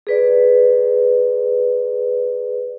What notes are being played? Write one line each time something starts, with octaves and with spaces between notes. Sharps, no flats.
G#4 B4 D5